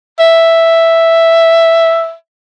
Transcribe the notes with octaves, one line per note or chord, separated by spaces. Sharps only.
E5